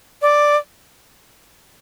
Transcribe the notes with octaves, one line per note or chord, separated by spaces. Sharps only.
D5